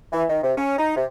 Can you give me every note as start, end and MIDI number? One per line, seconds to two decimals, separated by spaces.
0.13 0.24 52
0.29 0.38 51
0.43 0.52 48
0.57 0.77 61
0.78 0.94 63
0.96 1.05 48